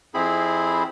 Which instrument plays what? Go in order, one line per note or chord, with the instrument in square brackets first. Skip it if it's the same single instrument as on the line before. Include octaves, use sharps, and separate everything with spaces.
[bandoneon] F2 C4 E4 G#4 B5